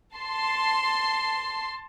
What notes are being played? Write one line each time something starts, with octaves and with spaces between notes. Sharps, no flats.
A5 C6 C7